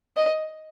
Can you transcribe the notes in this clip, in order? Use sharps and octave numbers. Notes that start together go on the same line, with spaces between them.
D#5